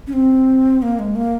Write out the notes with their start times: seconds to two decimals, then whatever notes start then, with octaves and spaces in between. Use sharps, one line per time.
0.07 C#4
0.13 C4
0.82 A#3
0.99 G#3
1.16 A#3